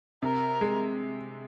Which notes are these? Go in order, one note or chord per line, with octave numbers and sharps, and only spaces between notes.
C3 A#4
G#3